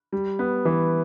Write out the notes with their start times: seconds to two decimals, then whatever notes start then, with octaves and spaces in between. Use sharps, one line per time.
0.12 G3
0.39 B3
0.65 E3